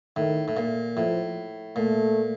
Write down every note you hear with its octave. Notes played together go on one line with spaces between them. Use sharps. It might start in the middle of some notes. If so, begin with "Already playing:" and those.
A2 D#3
A2
A#2
A2 F3
A#2 A3